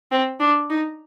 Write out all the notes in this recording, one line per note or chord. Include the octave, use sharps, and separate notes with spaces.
C4
D4
D#4